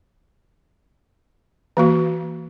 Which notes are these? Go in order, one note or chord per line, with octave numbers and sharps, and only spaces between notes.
E3 A#3 F#4